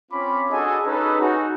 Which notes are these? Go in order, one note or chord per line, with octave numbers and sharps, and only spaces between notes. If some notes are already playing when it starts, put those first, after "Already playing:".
C4 C#4 F4 B5 D6
D4 F#4 G#4 A4 D#5 G#5
C#4 D#4 G#4 A4 B4
D#4 F#4 G#5